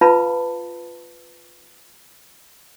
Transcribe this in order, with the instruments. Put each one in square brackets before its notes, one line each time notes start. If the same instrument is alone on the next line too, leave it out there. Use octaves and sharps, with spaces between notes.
[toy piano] F4 B4 F5 A5 B5